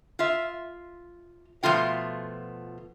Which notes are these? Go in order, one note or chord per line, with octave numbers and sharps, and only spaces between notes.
F4 E5
B2 F3 A3 F4 G5